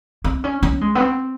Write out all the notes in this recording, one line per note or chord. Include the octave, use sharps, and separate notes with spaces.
C4
C#4
C#4
G#3
B3
C4